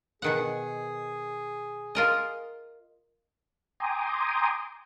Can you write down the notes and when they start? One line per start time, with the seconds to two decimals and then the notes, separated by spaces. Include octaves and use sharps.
0.22 B2 D#3 G#4 F#5
1.95 F4 A#4 D#5
3.80 G5 G#5 A#5 C6 D6 D#6